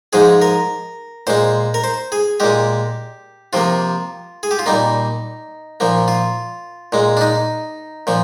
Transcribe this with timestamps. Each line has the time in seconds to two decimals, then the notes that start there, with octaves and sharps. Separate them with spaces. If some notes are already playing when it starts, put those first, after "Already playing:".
0.13 G#2 F3 G#3 G#4
0.42 A#4
1.27 A#2 G#3 C5
1.74 A#4
1.84 C5
2.12 G#4
2.40 A#2 G#3 G4
3.53 C3 F3 A#3 F4
4.43 G#4
4.51 G4
4.59 F4
4.66 A#2 G3 A#3 D#4
5.80 A#2 F3 A#3
6.08 F4
6.92 A#2 G#3
7.17 D4
7.21 D#4
8.07 A#2 F3